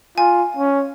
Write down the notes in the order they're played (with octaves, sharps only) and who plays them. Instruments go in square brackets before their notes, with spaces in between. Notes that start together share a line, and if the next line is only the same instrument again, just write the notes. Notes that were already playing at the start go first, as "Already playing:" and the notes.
[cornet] F4 [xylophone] G#5
[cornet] C#4